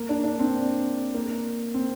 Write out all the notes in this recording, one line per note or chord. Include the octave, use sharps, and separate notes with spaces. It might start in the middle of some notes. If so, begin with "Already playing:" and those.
Already playing: A#3
D4
D4
C4
A#3
C4